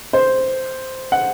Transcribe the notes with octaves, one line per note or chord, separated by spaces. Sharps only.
C5
F#5